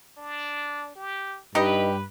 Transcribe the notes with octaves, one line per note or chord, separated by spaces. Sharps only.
D4
G4
G2 D#4 G4 B4 D#5